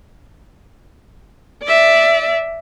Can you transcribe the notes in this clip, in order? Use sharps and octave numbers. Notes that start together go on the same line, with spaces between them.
D5 E5